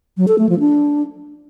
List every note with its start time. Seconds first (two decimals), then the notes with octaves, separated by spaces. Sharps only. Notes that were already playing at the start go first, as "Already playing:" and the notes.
0.17 F#3
0.28 A4
0.39 A3
0.49 F3
0.60 D4